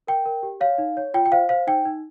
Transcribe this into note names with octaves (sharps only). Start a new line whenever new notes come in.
A#4 G5
A#4
G4
C#5 F5
D#4
C#5
F4 G5
G5
C5 F5
C5 F5
D#4 G5
D#4